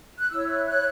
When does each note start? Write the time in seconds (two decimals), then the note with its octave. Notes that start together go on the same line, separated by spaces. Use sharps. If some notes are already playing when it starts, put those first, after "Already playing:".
0.18 F#6
0.30 E4 C#5 E6
0.48 F#6
0.67 F#6